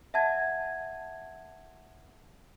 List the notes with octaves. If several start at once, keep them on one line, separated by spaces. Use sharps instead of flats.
E5 F#5 A5 G#6